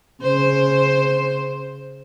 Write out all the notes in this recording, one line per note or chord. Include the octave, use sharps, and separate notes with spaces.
C#3 C5